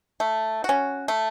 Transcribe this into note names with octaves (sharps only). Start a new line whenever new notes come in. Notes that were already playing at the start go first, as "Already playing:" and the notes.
A3
C#4 F#4
A3